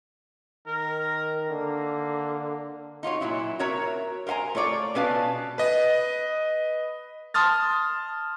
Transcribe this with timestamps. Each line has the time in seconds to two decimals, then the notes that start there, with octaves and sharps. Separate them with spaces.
0.66 D#3 A#4
1.50 D3 A#3
3.03 D#4 F4 F#4 C#5
3.21 A#2 F#3 E4
3.59 F#4 A#4 C#5 E5 A#5
4.27 A#4 C5 F5 G#5 A#5
4.55 A3 F4 C#5 D5
4.95 B2 C#4 B4 D5 F5 A5
5.58 B4 D#5
7.34 A5 C6 D#6 F6 A6